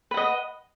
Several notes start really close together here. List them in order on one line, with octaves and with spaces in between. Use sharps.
B4 F#5 D#5